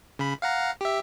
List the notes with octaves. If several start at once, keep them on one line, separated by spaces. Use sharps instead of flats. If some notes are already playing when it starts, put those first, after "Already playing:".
C#3 B5
F5 F#5 A#5
G4 E5